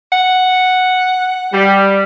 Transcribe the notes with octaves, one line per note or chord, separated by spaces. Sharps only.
F#5
G3